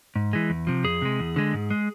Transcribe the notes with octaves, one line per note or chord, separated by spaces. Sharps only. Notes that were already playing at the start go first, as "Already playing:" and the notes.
G#2
E3 G#3
E2
C3 F3
F2 G#4
C3 G#3
E2
D3 G#3
G#2
G#3